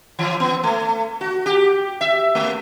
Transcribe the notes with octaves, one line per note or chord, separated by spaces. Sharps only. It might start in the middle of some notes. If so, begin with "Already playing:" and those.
E3
B3
A3
F#4
G4
E5
A3